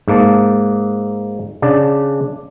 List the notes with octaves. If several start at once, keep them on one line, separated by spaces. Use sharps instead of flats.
G#2 A#3 A5
C#3 D4 A5